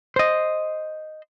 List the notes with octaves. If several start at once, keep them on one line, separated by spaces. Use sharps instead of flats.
C5 D#5